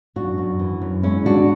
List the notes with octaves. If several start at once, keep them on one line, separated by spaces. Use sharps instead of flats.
F#2 D4 F#4
F#2
E3
F#2
G#3 C#4 E4
E3 D4 F#4